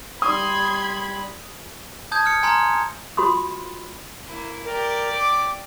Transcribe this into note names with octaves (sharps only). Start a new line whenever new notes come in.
G3 B5 C6 D#6 G#6
A5 D#6 G6 G#6
F6 C#7
G#5 A#5 C6 F6 G#6
F4 F#4 B5 C6 D#6
A#3 E4
G4 A#4 D5
D6